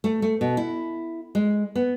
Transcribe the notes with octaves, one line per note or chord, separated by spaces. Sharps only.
A3
A3
B2
E4
G#3
B3